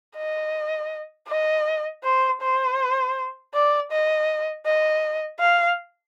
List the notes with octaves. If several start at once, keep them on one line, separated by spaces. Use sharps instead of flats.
D#5
D#5
C5
C5
D5
D#5
D#5
F5